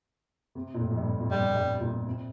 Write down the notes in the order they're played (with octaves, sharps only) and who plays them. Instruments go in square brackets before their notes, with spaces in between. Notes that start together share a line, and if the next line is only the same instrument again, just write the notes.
[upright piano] C3
A#2
A2
F2
G2
A2
F2
[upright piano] G2 [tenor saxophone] G3
[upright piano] G2
A#2
C3